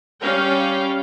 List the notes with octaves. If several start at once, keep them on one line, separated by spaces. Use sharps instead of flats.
G3 C#4 F5 G5